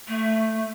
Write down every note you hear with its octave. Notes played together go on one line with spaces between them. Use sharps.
A3